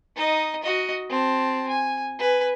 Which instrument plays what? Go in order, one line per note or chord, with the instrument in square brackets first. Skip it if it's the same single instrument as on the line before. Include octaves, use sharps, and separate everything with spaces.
[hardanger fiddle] D#4 D#5
F#4 D#5
C4 A5
G#5
B4 G#5